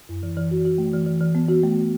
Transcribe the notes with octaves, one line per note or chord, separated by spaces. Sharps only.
F#2
E3
E3
F#4
F#4
A3
E3
E3
E3
B3
F#4
A3